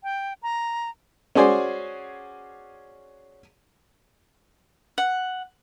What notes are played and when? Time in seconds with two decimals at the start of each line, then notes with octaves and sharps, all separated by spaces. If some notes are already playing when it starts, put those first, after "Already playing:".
0.03 G5
0.43 A#5
1.35 C#4 F#4 G#4 C5 D5 G#5
4.98 F#5